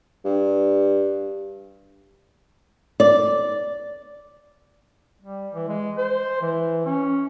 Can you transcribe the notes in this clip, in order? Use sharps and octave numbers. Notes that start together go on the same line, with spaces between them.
G2
D5
G3
E3
G#3
C5
E3
C#4